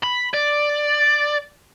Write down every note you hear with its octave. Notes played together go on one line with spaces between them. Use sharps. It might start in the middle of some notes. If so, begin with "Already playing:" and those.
B5
D5